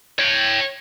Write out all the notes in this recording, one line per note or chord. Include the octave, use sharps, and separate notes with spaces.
C#5 G5